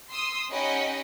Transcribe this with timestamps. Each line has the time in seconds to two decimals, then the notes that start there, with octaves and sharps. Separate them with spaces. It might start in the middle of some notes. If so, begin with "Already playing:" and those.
0.12 C6 D#6 E6
0.50 C#4 D#4 G4 D#5 F#5 B5